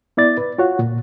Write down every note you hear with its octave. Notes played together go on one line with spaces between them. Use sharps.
B3 E4 D5 A6
B4
F4 F#4 C#5 F#5
A#2